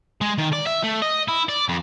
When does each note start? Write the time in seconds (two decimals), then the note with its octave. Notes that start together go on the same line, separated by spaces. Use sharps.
0.21 G#3
0.38 D#3
0.53 D5
0.66 E5
0.83 A3
1.02 D#5
1.28 E4
1.49 D5
1.69 F2